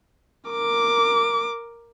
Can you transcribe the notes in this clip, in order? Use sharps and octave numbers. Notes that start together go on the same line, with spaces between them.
A#4 D6